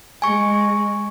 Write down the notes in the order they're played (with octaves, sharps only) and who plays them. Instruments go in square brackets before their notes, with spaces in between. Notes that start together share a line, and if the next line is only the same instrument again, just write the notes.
[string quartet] G#3 [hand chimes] G#5 C#6